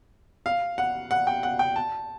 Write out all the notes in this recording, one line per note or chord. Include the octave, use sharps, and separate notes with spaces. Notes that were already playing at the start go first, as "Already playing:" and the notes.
F5
F#5
F#5
G5
F#5
G5
A5